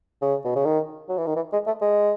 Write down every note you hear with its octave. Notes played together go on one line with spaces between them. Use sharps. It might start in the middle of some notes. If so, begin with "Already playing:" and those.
C#3
B2
C#3
D#3
F#3
E3
D#3
E3
G#3
A3
G#3